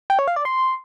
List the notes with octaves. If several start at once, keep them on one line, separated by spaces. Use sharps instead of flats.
G5
C#5
F5
D5
C6